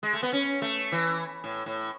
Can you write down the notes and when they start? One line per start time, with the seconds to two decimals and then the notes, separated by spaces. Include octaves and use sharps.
0.03 G#3
0.13 A3
0.23 B3
0.33 C#4
0.62 A3
0.92 E3
1.44 A2
1.66 A2